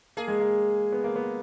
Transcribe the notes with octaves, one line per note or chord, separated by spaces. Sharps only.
A#3 G#4
G#3
A#3
B3
A#3
B3